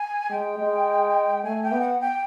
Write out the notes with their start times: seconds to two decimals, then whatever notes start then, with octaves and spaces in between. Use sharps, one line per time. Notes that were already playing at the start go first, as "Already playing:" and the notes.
Already playing: G#5
0.30 G#3 G5
0.59 G#3
1.44 A3 G#5
1.63 G5
1.72 B3
1.81 F#5
2.00 G5